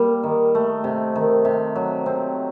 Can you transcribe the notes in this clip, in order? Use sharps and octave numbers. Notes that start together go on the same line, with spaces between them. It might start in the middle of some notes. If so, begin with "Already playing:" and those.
Already playing: G3 A#3
D#3
A3
C3
D#3
C3
F#3
C4